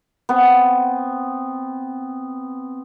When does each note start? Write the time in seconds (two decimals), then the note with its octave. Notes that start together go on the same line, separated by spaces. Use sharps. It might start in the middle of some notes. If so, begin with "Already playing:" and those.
0.29 B3 C4